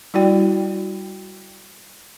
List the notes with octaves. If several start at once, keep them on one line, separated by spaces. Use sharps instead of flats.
G3 E4 F#4 D5 G5